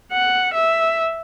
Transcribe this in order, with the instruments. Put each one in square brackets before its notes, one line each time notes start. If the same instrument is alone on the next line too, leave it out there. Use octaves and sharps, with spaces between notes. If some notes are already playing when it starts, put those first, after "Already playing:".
[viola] F#5
E5